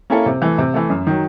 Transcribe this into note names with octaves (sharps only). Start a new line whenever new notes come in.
A#3 C#4 E4 A4
C3
E3 A3
C3
E3 A3
F#2
D#3 F#3